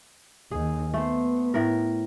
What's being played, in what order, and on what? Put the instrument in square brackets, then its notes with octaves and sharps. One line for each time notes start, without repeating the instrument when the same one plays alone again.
[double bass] D#2 D#3 [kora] G#4
[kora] A3 C5 [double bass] B3
[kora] A2 A#4